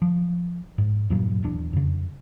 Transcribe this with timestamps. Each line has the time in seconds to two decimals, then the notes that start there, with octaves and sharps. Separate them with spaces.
0.02 F3
0.78 G#2
1.10 E2 G2 A#2 F#3
1.43 D#1 E2 D4
1.73 F2 C#3